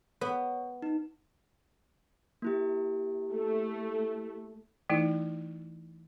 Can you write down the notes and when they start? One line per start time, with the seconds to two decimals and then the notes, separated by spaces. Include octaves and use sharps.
0.21 B3 C#5
0.82 D#4
2.42 A#3 E4 G4
3.33 A3
4.89 E3 A3 D#4 E4